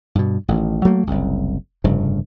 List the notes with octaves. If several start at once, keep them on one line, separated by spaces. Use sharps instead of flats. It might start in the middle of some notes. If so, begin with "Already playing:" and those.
G2 B2
A1 A2 D#3
F#3 A3 A#3
F#1 C2
F1 G2 C#3 F3